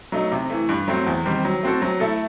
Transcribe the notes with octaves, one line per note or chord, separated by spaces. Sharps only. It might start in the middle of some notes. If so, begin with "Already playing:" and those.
F#3 A3 D#4
C3
E3 A3
G2
F#3 A3 C4
E2
D#3 G3 C4
F#3
A3 C4 F#4 A4
F#3
A3 E4 A4